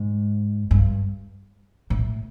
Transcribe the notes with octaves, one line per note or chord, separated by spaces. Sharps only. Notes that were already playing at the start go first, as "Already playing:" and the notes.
Already playing: G#2
G2
A2